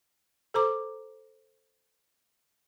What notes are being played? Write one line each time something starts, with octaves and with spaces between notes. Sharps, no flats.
A4 C5 A#5 D6